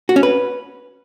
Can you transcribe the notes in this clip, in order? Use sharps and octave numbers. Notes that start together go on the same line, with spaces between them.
F#4
C#4
B4